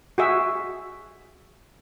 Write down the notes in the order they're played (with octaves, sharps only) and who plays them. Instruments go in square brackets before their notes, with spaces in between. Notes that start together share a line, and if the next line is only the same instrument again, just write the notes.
[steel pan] F#4 G#4 E5